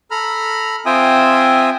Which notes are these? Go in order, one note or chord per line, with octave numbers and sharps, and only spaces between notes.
A4 A#5 B5 F6
C4 F4 E5 G5 G#5 D#6